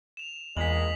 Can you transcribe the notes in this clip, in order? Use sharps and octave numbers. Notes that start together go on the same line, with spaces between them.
E7 F7
A#1 E2 A#2 G#3 B6 F#7